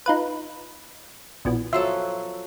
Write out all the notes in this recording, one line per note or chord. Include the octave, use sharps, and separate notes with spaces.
D#4 F4 B4
A#1 B2 E3
F3 F#3 A4 E5 C6